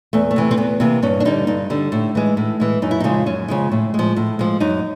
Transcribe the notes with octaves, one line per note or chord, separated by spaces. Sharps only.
E2 A3
A3
C3 E3
C4
E2 B3
C3 E3 A#3
G2 C#4
D4
D3 G3 D#4
G2 D#4
D3 G3
A2
E3 G#3
A2
E3 G#3
F#2 D#4
E4
C#3 F3 G#3 D#4
F#2 C#4
C#3 F3 G#3
A2
F3 G#3
A2
F3 G#3
F#2 D#4